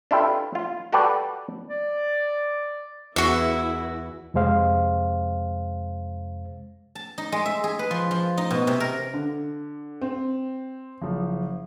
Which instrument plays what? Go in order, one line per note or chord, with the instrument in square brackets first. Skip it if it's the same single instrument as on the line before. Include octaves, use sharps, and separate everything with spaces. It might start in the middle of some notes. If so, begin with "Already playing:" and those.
[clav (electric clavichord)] D4 E4 F4 G4 A4 B4
F4
F#4 G4 A4 B4 D5
[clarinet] D5
[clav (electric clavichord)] E2 [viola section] E4 G#4 B4 [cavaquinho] F#4 E5
[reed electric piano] F2 C3 G#3 C5 F5
[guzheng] A5
D#4
G#3
E5
G#4
B4
F3
F3
D#4
B2
C3
A#4
[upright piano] D3
C4
F#1 F3